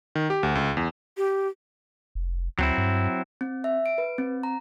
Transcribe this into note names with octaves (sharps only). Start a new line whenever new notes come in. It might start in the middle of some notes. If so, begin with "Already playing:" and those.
D#3
G4
D2
C#2
E2
G4
F1
D2 F#3 C4 E4
G2
C4
E5
D7
B4
C4
A#5